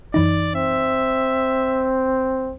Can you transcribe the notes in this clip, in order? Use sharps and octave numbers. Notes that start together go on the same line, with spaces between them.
F#2 E3 D#4 D5
C4 E5